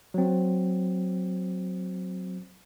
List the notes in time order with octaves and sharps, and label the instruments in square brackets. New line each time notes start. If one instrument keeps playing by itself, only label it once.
[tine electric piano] F#3 C4